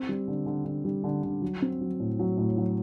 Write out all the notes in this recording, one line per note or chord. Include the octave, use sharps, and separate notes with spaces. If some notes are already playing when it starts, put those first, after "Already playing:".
Already playing: C4
G3
D3
D3
D3
G3
D3
D3
F#3
C4
F#3
A2
F#3
A2
F#3